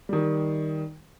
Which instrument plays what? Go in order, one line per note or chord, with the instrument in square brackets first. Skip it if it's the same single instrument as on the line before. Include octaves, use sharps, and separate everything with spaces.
[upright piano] D#3 G3